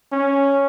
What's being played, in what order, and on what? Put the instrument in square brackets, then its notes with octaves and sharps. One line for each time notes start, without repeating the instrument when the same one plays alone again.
[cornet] C#4